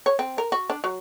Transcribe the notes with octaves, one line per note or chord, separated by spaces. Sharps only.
C#5
C4
A#4
F#4
D4
F#3